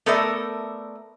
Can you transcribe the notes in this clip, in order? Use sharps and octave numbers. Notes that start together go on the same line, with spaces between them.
A3 B3 A4 A#4 D5 E5